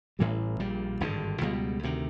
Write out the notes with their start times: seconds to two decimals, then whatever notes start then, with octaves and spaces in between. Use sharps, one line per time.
0.19 A1 A2 E3 G3
0.59 A#1 A#2 G3
1.01 G#1 G2 D3
1.41 C#2 B2 G3
1.83 D2 C3 D#3